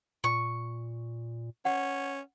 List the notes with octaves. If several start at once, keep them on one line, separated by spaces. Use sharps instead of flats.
A#2 C#6
C#4 F#5